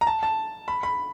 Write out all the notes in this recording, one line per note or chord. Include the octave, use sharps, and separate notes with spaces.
A#5
A5
A5
B5
B5